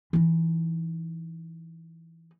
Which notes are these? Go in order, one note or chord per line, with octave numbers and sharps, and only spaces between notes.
E3 D#4